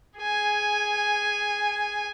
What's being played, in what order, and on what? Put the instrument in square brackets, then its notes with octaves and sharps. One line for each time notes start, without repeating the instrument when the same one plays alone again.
[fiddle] G#4 G#5